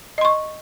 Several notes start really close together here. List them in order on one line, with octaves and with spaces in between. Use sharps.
D#5 C6 C#6